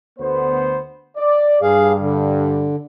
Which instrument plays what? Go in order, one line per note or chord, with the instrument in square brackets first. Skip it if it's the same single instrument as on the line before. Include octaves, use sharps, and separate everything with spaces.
[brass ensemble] D2 B3 C5
D5
[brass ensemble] G2 [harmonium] G#4 F5
[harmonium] D3